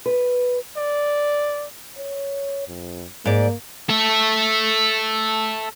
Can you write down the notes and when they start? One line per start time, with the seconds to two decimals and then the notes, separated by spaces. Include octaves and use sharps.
0.06 B4
0.77 D5
1.98 C#5
2.68 F2
3.25 G#2 A#3 D5
3.90 A4 E5